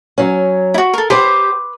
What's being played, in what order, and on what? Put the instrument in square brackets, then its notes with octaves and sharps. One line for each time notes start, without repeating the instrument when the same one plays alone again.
[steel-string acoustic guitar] F#3 C#4
[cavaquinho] E4 F#4
A4 A#4
[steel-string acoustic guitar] G4 C5 [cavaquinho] B4 C6 D6